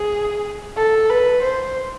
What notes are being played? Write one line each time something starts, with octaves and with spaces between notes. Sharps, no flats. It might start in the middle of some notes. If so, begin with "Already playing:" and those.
Already playing: G#4
A4
B4
C5